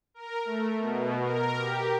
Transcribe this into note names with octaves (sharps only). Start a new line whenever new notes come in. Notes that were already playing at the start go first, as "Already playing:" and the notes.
A#4
A3
B2
A#4
G4